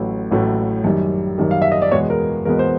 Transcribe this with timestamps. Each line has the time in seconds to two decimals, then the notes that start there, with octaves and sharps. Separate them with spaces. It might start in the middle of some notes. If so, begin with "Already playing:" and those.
Already playing: A1 A2 F#3 A3
0.31 A1 A2 F#3 A3
0.84 F#2 D#3 G3
1.38 F#2 D#3 G3
1.51 F5
1.62 E5
1.72 D#5
1.82 D5
1.91 E2 B2 G#3 B3 C#5
2.10 A#4
2.45 E2 B2 G#3 B3 A#4
2.59 C5